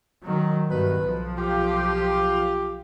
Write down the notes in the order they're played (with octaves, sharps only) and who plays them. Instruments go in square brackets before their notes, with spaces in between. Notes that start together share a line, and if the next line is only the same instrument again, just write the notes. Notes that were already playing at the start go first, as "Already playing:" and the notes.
[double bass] D#3 F#3
[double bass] G2 D#3 [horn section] B2 B4
[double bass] B1 F3
[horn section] F4 G4